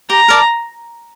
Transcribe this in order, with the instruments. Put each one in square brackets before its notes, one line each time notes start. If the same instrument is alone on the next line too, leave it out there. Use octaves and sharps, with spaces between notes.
[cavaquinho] G4 [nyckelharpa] A#5
[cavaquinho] A#4 D5 A5